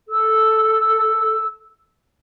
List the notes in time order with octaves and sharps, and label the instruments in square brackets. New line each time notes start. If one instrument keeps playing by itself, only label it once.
[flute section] A4 E6